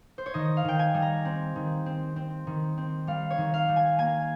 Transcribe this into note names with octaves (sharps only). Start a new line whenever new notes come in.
C5
C#5
D#3 D#5
F5
D#3 G5
G#5
G3
A#5
C4
D#3
C4
C4
D#3
C4
G3 F5
C#5
D#3
F5
G3
G#5
A#3 G#5